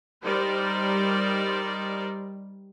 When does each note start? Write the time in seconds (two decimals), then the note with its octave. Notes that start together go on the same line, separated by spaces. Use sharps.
0.23 G3 D#4 A#4 C5 D5